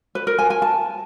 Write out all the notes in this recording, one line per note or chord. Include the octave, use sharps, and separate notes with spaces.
B4
A#4
G#5
G#5
A5